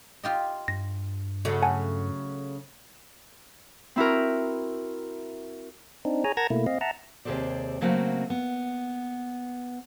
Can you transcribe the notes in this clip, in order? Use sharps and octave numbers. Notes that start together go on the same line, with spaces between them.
F4 G4 D#5
G2 A#6
C#3 F#3 A3
F#5 G#5 A5
C4 E4 F#4 A#4
C4 D4 D#4
G#4 C#5 G#5 A#5
A#4 F#5 A5 A#5 G#6 A#6
B2 A3 A#3 E4
C4 D#5 F5
E5 F#5 A5 A#5
D#2 C3 G#4 A4 C5 D5
C#3 F#3 A3 A#3 C4
B3